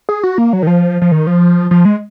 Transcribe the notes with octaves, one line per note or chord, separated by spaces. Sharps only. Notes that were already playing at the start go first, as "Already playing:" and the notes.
G#4
F#4
A#3
F#3
D#3
F3
F3
D#3
F3
F3
G#3